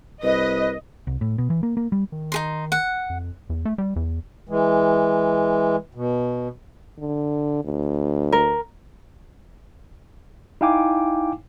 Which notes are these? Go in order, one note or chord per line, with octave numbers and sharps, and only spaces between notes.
C2 B4 D#5
C2
A2
B2
E3
A#3
A#3
G3
D#3
D#4 G#4 C6
F#5
F2
E2
A3
G3
E2
E3 G#3
B2
D3
D2
A#4
D#4 E4 F5 G5 G#5 D6